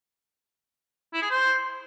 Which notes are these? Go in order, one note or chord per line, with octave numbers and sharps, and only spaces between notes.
E4
G#4
C5